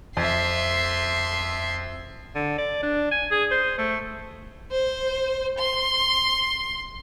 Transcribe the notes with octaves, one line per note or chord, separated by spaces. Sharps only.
F2 E5 C6
D3
D5
D4
G#5
G#4
C5
A3
C5
C6